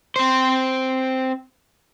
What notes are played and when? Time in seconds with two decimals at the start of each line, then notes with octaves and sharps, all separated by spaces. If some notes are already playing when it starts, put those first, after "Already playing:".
0.16 C4 C5